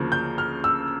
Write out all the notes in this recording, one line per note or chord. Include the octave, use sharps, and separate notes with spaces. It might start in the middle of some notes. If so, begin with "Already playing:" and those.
Already playing: D2 C#3 F3 A#3
G6
F6
E6